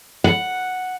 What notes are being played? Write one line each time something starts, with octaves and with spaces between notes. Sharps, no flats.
F#5